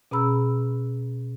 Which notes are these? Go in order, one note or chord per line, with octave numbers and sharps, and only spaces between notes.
B2 C#4 G#4 A#5 B5 E6